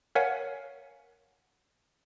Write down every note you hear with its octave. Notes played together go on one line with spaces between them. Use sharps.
A#4 C#5 F5 F#5 G#5 B6